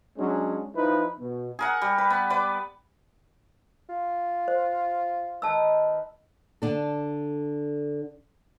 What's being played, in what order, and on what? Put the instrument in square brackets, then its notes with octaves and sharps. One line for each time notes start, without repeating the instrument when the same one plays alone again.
[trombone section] F#3 G#3 C#4 D4
F3 D#4 E4 B4
B2
[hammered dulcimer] G#4 A#4 F#5
G3
B4
B3
B4 D5 D6
[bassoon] F4
[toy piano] C5
[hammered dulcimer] D#3 D#4 B4 [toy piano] A5 E6
[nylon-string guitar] D3 D4 A4